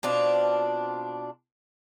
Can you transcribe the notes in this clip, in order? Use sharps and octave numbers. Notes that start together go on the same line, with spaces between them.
B2 C4 D4 F4